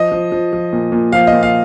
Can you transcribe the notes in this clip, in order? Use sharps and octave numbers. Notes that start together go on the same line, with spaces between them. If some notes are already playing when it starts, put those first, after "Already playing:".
Already playing: F3 D#5
F3
F3
F3
A#2
A#2
F3 F5
D#5
A#2
F5